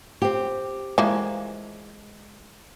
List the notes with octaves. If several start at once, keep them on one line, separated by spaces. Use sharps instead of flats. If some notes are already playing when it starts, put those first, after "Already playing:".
C4 G4
E3 F3 G#3 A#3